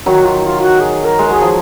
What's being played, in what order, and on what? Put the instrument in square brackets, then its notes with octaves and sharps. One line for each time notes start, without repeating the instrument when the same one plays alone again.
[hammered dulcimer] D#3 F#3 [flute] F#4
[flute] F4
F4
F#4
G#4
A#4
[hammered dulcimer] G#3
[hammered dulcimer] F#3 [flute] G#4
[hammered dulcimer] F3